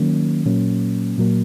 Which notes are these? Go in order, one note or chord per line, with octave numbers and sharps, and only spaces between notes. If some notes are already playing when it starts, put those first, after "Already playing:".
Already playing: D#3 F#3 A#3 C#4
A#2 F#3 A#3 C#4
A#2 F#3 A#3